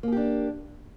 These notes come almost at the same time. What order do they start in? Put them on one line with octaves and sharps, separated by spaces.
A#3 G#4 G4 D4